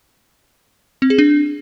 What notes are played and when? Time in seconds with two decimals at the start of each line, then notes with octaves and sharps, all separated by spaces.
1.02 C4
1.10 G#4
1.18 D4